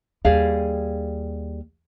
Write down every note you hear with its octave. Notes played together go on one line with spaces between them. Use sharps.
D#2 G3 G#4 F5